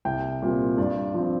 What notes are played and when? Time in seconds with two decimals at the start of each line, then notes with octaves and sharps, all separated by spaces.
0.05 C2 G5
0.42 A#2 G3 C4
0.78 G2 D5
1.14 F3 C4